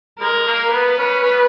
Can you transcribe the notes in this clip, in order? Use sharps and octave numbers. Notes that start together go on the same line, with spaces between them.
G#3 A#4
A#3
B3 B4
C#4
C#4
B3